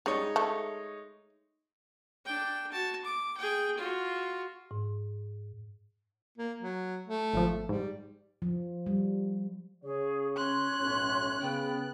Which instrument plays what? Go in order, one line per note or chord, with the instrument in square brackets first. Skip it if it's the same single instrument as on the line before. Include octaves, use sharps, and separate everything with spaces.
[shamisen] G3 [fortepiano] G#3 D#4 C#5
[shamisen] A3
[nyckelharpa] D4 G5
F#4 A5
D6
G#4 G5
F4 F#4
[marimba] G#2
[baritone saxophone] A#3
F#3
A3
[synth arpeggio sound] G#1 F3
[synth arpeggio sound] G#2 [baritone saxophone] G3
[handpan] F3
G3
[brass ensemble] C#3 C#5 [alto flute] G#4
[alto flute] C#4 [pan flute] C6 [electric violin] F#6
[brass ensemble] B1 A2
[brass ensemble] C#3 [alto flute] B3 [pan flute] G5